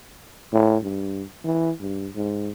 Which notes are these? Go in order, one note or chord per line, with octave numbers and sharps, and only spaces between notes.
A2
G2
E3
G2
G#2